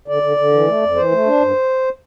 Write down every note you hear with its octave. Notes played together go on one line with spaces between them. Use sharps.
D3 D5
D3
D3
E3
A3
F2
E3 C5
A3
D4
G2